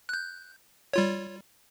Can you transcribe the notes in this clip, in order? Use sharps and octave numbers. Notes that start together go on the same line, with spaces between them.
F#6 G6
G3 F4 C#5